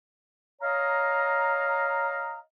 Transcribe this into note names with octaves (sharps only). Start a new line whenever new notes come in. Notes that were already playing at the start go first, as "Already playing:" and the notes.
C#5 D#5 F5 A#5